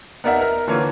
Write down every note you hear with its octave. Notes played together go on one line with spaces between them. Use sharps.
B3 D#4 A#4 D5 E5 F#5
A#4
D3 E3 A#3 F4 A#4 C#5